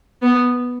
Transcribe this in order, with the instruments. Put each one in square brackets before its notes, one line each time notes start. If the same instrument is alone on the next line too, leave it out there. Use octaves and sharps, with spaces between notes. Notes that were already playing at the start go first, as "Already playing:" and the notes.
[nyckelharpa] B3